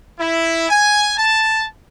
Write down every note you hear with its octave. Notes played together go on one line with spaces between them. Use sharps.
E4
G#5
A5